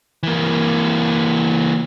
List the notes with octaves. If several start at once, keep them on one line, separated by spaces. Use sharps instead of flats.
E3 A#3